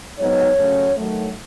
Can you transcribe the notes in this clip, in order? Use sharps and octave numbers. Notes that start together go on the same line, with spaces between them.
G#2 F#3 B3 D#4 C#5
C#3 F#3 A3 C#4
D#3 F#3 A3